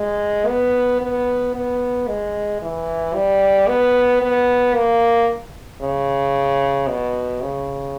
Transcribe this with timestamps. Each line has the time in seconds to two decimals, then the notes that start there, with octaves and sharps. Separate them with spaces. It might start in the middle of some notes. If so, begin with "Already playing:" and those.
Already playing: G#3
0.47 B3
1.01 B3
1.55 B3
2.08 G#3
2.62 E3
3.15 G3
3.68 B3
4.22 B3
4.75 A#3
5.82 C#3
6.88 B2
7.42 C#3